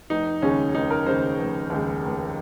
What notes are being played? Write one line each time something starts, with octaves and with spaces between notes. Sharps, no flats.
F1 D#4
D#2 C#3 G#3 C#4
F1 D#4
A#4
D#2 C#3 G#3 C5
F1
D#2 C#3 G#3
F1